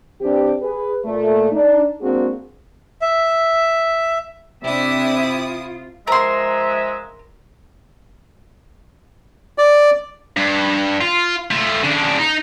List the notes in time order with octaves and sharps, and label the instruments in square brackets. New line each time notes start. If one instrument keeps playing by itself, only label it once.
[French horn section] E3 C4 D4 G4
G#4 B4
A#2 A3
D4 D#4
G#3 A#3 C4 D4 F#4 G#4
[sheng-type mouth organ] E5
[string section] C3 [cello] D4 E5 [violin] E4 D#6 [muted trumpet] G4
[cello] F4
[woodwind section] F3 G#3 E5 [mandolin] A#4 C6
[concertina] D5
[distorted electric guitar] G2
F4
A3 F4
C#3 D4
D#4